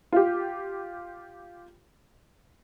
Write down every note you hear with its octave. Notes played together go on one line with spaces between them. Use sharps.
F4 G4